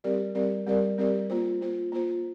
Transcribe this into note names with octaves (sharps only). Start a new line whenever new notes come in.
G3 C4 G4 A#4 D5
G3 C4 G4 A#4 D5
G3 C4 G4 A#4 D5
G3 C4 G4 A#4 D5
A#3 F4 C5
A#3 F4 C5
A#3 F4 C5